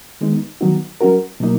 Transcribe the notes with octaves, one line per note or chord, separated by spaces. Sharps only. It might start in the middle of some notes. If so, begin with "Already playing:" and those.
D#3 G#3 B3 D#4
D#3 F#3 B3 D#4 F#4
F#3 C#4 F#4 A#4
B2 F#3 A#3 D#4